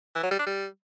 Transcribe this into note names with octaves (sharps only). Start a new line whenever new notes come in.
E3
F#3
G3
D4
G3